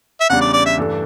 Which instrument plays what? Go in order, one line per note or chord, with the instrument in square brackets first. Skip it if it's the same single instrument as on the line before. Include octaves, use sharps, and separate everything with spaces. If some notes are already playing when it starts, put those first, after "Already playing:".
[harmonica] E5
[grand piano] E2 C#3 G3 D4 [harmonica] F#5
[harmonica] D5
D5
E5
[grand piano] G2 E3 A3 D4 A4